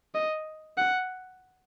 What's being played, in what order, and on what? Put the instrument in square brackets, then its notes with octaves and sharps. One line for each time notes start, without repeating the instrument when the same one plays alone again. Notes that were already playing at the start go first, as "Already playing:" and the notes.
[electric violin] D#5
F#5